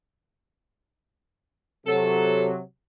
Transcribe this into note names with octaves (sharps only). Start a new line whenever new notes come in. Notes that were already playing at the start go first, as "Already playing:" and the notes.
C3 F#3 A4